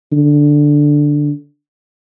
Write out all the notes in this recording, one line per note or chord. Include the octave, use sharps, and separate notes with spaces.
D3